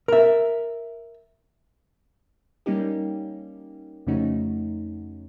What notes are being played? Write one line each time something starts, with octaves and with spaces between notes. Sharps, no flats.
A#4 E5
G3 A#3 C#4 D#4 G4
F2 C#3 A3 C#4 D#4 F#4